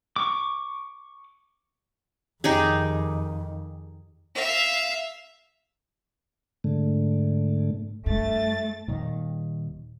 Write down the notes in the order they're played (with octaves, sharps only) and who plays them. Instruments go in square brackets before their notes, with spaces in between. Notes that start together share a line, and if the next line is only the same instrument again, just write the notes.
[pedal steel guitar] C#6 D6
[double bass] F2 D#3 [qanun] D#4 G4 G#4
[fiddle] E5 F5
[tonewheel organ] G#2 D3 A3
[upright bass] G2 [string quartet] A3 A6
[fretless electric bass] D#1 D#2 D#3